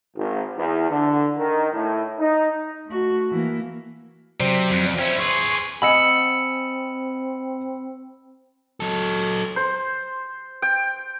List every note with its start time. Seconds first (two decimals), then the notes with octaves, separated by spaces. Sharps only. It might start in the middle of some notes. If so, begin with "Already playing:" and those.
0.16 G#1
0.57 E2
0.89 D3
1.37 D#3
1.72 A2
2.19 D#4
2.87 A3 F#4
3.31 E3 A#3
4.40 C3 F#3 C5 D5
4.72 F2
4.99 C#4 E4 C5 G5
5.19 G#4 B4 C6 C#6
5.82 C4 D#5 F#5 G#5 B5 E6 C#7
8.80 F#3 A4
9.56 C5
10.62 G5